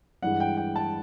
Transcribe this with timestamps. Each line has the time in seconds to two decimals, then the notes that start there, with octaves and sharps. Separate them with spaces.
0.23 G2 E3 G#3 F#5
0.40 G5
0.57 G5
0.76 A5